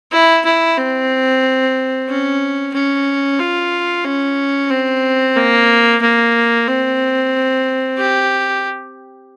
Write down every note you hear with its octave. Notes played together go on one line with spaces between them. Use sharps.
E4
E4
C4
C#4
C#4
F4
C#4
C4
A#3
A#3
C4
G4